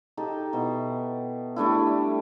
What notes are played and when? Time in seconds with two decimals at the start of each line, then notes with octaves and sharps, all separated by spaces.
0.17 D#4 G4 A4
0.53 B2 E4
1.56 G3 A3 D4 E4